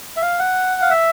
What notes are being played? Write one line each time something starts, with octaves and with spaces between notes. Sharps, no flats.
E5
F5
F#5
F5
E5